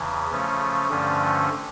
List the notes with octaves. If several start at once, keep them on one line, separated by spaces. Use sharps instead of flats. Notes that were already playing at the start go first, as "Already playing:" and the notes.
Already playing: E2 C#3 E3
C#3 F3 A3 C#4
G2 D3 F3 A3 C#4